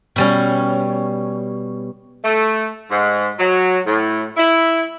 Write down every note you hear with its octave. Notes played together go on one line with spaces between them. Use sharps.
B2 G3 C#4
A3
G#2
F#3
A2
E4